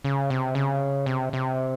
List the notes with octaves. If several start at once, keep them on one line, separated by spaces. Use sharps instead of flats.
C#3
C3
C#3
C3
C3